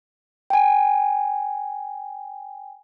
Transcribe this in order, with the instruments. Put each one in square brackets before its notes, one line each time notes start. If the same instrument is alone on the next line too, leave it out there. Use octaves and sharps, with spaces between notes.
[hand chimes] G5 G#5